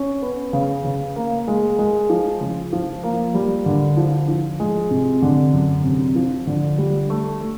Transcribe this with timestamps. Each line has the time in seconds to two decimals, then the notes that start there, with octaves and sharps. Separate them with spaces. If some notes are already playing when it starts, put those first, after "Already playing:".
Already playing: C#4
0.22 B3
0.53 C#3
0.84 C#3
1.16 A#3
1.48 G#3
1.79 G#3
2.10 F3
2.41 C#3
2.73 F3
3.04 A#3
3.34 G3
3.66 D3
3.97 F3
4.29 F3
4.60 G#3
4.91 C3
5.22 D3
5.53 F#2
5.84 C3
6.16 F3
6.47 D3
6.78 G3
7.10 A3
7.41 A3